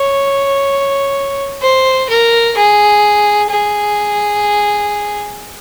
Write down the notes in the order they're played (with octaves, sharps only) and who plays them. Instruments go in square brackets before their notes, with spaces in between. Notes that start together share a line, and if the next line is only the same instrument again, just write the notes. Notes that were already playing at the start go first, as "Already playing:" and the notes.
Already playing: [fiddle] C#5
C5
A#4
G#4
G#4